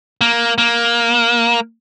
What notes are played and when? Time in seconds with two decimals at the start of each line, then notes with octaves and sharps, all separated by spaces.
0.21 A#3
0.58 A#3